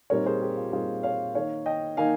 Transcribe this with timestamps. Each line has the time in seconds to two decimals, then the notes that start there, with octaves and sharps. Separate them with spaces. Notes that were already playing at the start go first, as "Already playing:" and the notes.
0.10 A#2 G3 C4 D#4 A#4 C#5
0.26 G#4 C5
0.42 G4
0.57 F4
0.72 A#2 G3 C4 D#4 F4 G#4
1.03 C#5 F5
1.34 D#3 A#3 D#4 C#5 F5
1.66 D#5 G5
1.97 D#3 A#3 D#4 F5 G#5